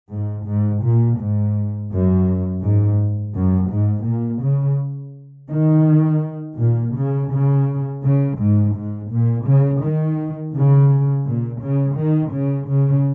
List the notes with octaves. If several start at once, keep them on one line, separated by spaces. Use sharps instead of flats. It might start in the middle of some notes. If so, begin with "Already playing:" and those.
G#2
G#2
A#2
G#2
F#2
G#2
F#2
G#2
A#2
C#3
D#3
A#2
C#3
C#3
C#3
G#2
G#2
A#2
C#3
D#3
C#3
A#2
C#3
D#3
C#3
C#3